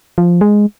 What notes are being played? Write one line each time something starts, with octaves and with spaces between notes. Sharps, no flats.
F3
G#3